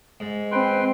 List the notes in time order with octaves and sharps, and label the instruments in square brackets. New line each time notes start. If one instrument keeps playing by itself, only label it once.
[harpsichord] G#2
[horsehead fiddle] C4 [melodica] B4 G5 C6